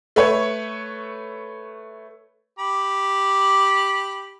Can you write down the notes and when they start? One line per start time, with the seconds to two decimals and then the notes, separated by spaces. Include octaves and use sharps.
0.16 A3 B4 C#5
2.59 G4 B5